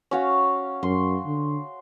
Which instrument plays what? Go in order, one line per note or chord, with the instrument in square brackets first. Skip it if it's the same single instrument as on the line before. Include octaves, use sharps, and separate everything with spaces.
[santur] C#4 F#4 F5
[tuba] F#2 [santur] C6
[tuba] D3